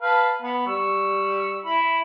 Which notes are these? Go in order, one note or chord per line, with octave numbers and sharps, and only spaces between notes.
B4 F5 A5
B3 B5
G3 C#6 E6
E4 B5